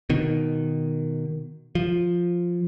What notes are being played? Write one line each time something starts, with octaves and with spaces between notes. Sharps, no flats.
B2 D#3
F3